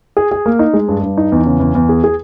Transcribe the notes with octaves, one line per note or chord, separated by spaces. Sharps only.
G#4
G#4
A#3
D#4
G#3
G2
G2
D#4
E2
C#3
E2
E2
G#4
G#4